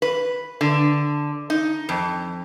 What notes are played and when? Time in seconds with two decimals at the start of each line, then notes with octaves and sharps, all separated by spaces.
0.02 B4
0.61 D3
1.50 D#4
1.89 F2